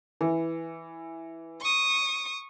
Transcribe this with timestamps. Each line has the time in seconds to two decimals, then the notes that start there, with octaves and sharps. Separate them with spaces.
0.21 E3
1.61 C#6 D#6